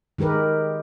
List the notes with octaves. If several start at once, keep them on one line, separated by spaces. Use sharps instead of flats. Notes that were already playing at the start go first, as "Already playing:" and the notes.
D#3 G#3 G4 A#4 B4